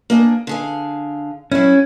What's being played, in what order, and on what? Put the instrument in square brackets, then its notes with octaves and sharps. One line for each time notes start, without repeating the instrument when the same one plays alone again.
[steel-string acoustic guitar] A#3 D4 G#4
D3 G#4 F5
[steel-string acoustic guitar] F#3 E4 [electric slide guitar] C#4